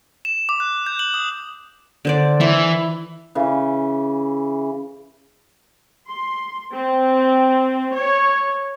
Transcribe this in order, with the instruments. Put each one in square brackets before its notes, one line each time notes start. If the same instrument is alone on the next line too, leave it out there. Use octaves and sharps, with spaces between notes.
[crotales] E7
D6
F#6
G6
F#7
D#6
[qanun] D3 C5 D5
[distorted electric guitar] E3 [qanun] E4
[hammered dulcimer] C#3 E3
[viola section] C6
C4
C#5